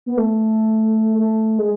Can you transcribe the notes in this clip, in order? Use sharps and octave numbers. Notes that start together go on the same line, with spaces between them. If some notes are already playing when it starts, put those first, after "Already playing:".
B3
A3
A3
G#3